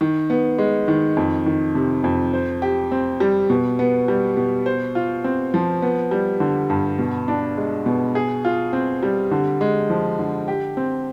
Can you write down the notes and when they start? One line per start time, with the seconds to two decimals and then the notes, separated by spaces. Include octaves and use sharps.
0.01 D#3
0.30 B3
0.58 G#3
0.88 D#3
1.17 F2
1.46 D#3
1.75 C3
2.04 F2
2.33 C5
2.62 G4
2.92 C4
3.20 G3
3.50 B2
3.79 B3
4.08 G3
4.37 B2
4.66 C5
4.95 F4
5.24 C4
5.54 F3
5.82 B3
6.11 G3
6.40 D3
6.70 G2
6.98 B2
7.28 D4
7.57 G#3
7.86 B2
8.15 G#4
8.45 F4
8.73 C4
9.03 G3
9.31 D3
9.61 G#3
9.90 F3
10.19 D3
10.48 G4
10.77 C4